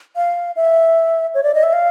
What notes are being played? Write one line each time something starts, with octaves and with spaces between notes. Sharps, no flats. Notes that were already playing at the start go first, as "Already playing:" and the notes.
F5
E5
C#5
D5
D#5
E5
F5